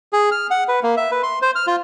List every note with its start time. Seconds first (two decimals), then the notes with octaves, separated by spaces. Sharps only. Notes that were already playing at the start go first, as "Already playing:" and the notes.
0.13 G#4
0.31 F6
0.51 F#5
0.68 B4
0.83 A#3
0.97 E5
1.11 B4
1.23 C6
1.42 C5
1.55 F6
1.67 F4